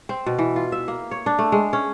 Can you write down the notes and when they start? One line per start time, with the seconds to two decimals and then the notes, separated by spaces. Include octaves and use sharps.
0.09 C4
0.26 B2
0.39 E3
0.56 F4
0.72 E5
0.88 A#3
1.11 C#5
1.26 D4
1.39 A3
1.52 G#3
1.73 C#4